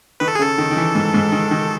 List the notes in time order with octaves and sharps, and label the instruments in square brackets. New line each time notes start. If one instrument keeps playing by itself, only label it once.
[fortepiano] D#3 [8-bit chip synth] B4
[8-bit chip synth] A4
G#4
[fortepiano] C#3
[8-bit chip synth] A4
[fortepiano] D#3
D#3
E3
G#2
G#2
D#3
D#3